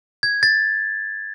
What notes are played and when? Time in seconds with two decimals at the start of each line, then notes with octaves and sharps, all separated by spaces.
0.23 G#6
0.43 A6